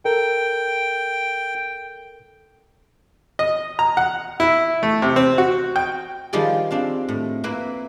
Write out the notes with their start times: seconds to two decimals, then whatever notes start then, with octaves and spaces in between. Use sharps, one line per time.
0.05 A4 A#4 G5
3.39 D#5
3.79 A#5
3.97 F#5
4.40 E4
4.83 A3
5.02 C3
5.16 C4
5.38 F#4
5.76 G5
6.33 D#3 F3 G3 F4 G#4 D5
6.71 C4 D4 F5
7.09 A2
7.44 A#3 C4 E4 B4